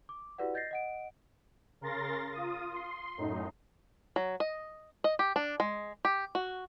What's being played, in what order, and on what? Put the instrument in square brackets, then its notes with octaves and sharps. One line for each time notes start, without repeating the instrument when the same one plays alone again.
[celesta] D6
E4 F#4 G4 B4 D5 F#5
D#5 G6 A6 A#6 C7
D#5 F#5 D7
[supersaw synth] C#3 A#4 C6 A6 A#6
F4 D#6
C6
F#2 A2 D#4
[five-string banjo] F#3
D#5
D#5
G4
D4
G#3
G4
F#4